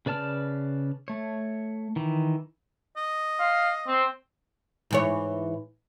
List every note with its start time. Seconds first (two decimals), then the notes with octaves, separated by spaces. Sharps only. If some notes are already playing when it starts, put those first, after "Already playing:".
0.06 C#3 B4 D5 A5 F6
1.08 A3 C#5
1.96 D#3 E3
2.97 D#5
3.40 F5
3.87 C4
4.91 G#2 E3 C#5